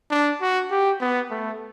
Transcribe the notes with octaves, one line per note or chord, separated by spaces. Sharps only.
D4
F#4
G4
B3
A3